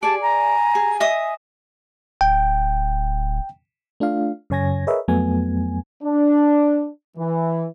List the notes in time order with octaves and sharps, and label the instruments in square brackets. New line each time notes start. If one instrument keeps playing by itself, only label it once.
[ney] G4 [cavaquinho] G#4 D5 [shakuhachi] A5
[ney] G#5 [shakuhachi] A#5
[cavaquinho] G#4
D#5 E5 D#6
[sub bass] D1 [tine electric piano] G5
[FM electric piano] A3 D4 F4 F5
F#2 C#3 C#5 G#5 G#6 A#6
G#4 A#4 B4 C#5 D#5 E5
F2 F#3 A3 B3 G#5
[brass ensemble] D4
E3